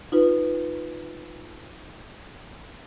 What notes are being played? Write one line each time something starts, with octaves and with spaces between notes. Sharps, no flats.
D#4 F4 B4